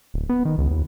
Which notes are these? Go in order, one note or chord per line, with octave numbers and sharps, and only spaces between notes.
D1
B3
D#3
C#2
D#2